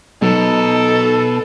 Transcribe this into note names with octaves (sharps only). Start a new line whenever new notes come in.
B2 F#3 D#4 A4